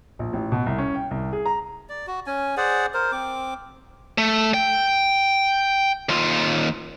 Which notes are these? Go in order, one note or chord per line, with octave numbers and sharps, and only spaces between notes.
A#1
A1
B2
C2
C#4
G5
C2
G#4
A#5
D5
F#4
C#4 G#5
G#4 C5 D5 F#5
A#4 C5
C4 D6
A3
G5
D#2 F4